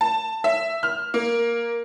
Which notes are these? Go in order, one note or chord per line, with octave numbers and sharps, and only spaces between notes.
A5
E5
F6
A#3